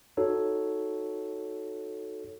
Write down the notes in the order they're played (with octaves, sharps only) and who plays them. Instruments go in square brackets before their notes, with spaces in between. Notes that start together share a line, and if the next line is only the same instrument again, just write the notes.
[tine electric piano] D#4 F#4 A4 C#5